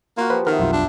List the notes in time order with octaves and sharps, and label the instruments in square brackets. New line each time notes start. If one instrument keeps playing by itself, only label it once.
[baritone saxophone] A#3 [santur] F4 F#4
[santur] F3 G4 [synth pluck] B4
[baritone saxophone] D#3 [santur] B3 E5 [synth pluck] A#4
[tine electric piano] B1 F2 F4 [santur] E5 G5
[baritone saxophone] D4